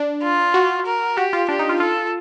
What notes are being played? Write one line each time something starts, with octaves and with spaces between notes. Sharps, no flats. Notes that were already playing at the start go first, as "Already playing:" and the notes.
Already playing: D4
F4
F#4
A#4
F#4 G4
F4
D4 G4
D#4
F4
F4 A4